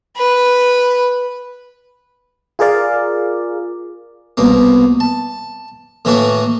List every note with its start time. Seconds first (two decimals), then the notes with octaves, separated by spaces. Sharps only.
0.17 B4
2.59 F4 G#4 A#4 D5 F5
4.37 C2 B2 A#3
5.00 A5
6.05 A2 D#3 E3 A3 A#3 F#4